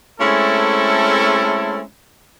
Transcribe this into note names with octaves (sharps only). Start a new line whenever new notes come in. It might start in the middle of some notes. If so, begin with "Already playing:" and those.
G#3 A3 C4 C#4 E4 A4